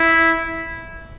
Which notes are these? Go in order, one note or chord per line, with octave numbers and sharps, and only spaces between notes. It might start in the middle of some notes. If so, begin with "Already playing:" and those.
Already playing: E4